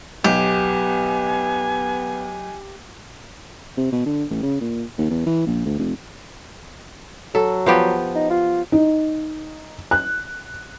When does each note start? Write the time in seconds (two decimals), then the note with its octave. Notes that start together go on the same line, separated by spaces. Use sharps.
0.24 B1 B3 G4 G#5
3.77 C3
3.92 B2
4.06 D3
4.30 A1
4.43 C#3
4.61 A#2
4.98 D#2
5.10 E2
5.26 E3
5.47 A#1
5.65 D2
5.79 F1
7.35 F#3 A4
7.66 F3 B3 G4
8.15 D#4
8.30 F4
8.72 D#4
9.91 F#6